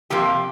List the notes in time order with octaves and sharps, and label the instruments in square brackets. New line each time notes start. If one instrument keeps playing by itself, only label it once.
[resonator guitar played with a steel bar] F2 C3 F3 A#3 G4